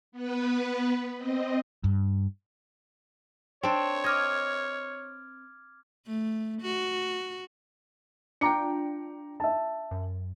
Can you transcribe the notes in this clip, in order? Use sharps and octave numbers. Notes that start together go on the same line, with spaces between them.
B3 B4
C4 D#5
G2
C4 D4 C#5
D#5 D6 F6 G#6
A3
F#4
D4 F4 G5 A#5 D6 C#7
E5 A5
F#2